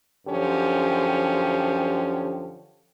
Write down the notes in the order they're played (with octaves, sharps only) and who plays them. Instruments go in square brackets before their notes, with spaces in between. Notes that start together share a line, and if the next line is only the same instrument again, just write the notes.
[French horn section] F#2 D3 F3 C#4 G4